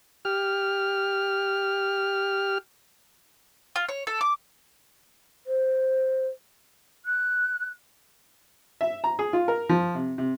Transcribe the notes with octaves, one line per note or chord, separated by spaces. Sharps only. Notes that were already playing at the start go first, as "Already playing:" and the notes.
G4 F6
F4
C#5
A4
D6
C5
F#6
E5
A#5
G#4
F4
A#4
F3
C3
C3